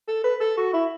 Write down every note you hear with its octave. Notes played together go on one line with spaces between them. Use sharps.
A4
B4
A4
F#4
E4